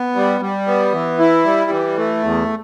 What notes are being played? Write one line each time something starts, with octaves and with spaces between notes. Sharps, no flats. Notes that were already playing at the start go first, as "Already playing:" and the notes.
Already playing: B3
G3
G3
B3
E3
E4
G3
E3
A3
E2